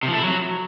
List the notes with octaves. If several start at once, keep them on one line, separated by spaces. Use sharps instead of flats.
C3
F3
A3
E4
F#3